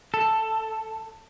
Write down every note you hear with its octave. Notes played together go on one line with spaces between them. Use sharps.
A4